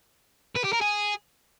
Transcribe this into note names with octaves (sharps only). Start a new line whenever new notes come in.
B4
G4
A#4
G#4